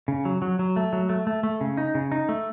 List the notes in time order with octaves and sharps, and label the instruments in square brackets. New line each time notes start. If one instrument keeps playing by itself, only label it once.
[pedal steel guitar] C#3
F#3
F#3
F#3
A3
F#3
A3
A3
A3
C#3
D#4
C#3
D#4
A3